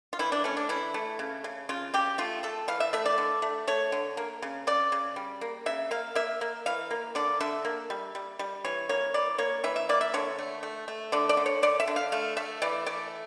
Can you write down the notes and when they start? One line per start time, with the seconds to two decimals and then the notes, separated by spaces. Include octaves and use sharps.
0.13 F4
0.19 E3 E4
0.32 D4
0.44 A3 C#4
0.57 D4
0.69 E3 E4
0.94 A3
1.19 C#3
1.44 C#3
1.69 C#3 F4
1.94 C#3 G4
2.18 A3 F4
2.43 A3 A4
2.68 E3 F5
2.80 E5
2.93 A3 E5
3.06 D5
3.18 D3
3.42 A3
3.67 A3 C#5
3.92 D3
4.17 A#3
4.42 C#3
4.67 C#3 D5
4.92 C#3
5.16 G3
5.41 A#3
5.66 C#3 E5
5.91 A#3 F5
6.15 A#3 E5
6.41 A#3
6.66 E3 F5
6.91 A#3
7.15 D3 D5
7.40 D3 E5
7.65 A#3
7.90 G3
8.15 G3
8.39 G3
8.64 E3 C#5
8.89 A#3 C#5
9.14 E3 D5
9.38 A#3 C#5
9.64 E3 E5
9.76 E5
9.89 A#3 D5
10.01 E5
10.14 D3 C#5
10.39 A3
10.63 A3
10.88 A3
11.12 D3 D5
11.29 D5
11.37 D3
11.46 C#5
11.62 D3 D5
11.80 E5
11.87 D3
11.96 F5
12.12 A3 F5
12.37 A3 E5
12.62 E3 D5
12.86 A3 D5